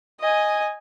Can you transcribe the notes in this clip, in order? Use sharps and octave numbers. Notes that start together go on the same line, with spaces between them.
D#5 G#5